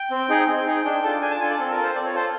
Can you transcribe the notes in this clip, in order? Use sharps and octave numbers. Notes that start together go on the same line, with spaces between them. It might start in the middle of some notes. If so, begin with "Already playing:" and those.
Already playing: G5
C4
D#4 G#4
C4
D#4 G#4
D4 G5
F4 A4
D4 G#5
A5
F4 A4 G#5
D5
C4 A4
A#4
F4 A4
C5
C4 D5
C#5
F4 A4 C5